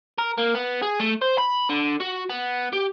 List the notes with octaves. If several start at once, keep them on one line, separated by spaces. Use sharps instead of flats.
A#4
A#3
B3
G#4
A3
C5
B5
D3
F#4
B3
G4